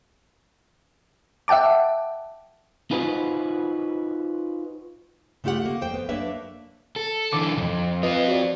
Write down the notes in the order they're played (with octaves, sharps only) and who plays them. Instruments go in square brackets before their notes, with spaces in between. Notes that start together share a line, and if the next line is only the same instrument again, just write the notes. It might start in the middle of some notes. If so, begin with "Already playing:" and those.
[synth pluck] E5 F#5 G5 A5 D6
[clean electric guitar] D#4 F4 F#4 B4 C5 D#5
[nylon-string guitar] C#3 A3 F4 G4 F#5
A#3
F2 C5 G5
B3
F#2 A#3 D4 B4 C#5 E5
[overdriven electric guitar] A4
[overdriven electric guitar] D3 E3 [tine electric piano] D6
[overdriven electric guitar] B1 F2
[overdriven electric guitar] C4 F4 [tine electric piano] B4 D#5
[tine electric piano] F#4 D5